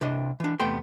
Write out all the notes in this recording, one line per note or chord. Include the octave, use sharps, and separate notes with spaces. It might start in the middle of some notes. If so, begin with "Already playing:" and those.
C2 C3 D4 D#5
E3 D4
E2 C3 A3 B3 G5 C6